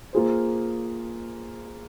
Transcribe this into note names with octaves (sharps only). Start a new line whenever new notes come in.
A#3 F4 G#4 C5